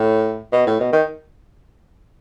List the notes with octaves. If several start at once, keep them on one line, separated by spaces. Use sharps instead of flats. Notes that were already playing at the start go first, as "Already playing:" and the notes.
Already playing: A2
B2
A2
B2
D#3